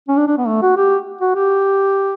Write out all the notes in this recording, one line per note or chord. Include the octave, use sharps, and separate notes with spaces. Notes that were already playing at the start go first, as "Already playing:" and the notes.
C#4
D4
D4
B3
A3
F#4
G4
F#4
G4